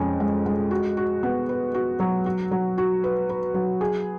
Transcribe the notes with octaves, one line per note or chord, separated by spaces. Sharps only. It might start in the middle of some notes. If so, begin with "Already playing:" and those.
Already playing: F2 G#3 C#4
G#3
G#3
F#4
F#4
B3
B4
F#4
F#3
F#4
F#3
F#4
B4
B4
F#3
G#4